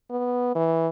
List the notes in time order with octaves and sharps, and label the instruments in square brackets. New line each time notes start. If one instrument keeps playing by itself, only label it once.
[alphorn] B3
E3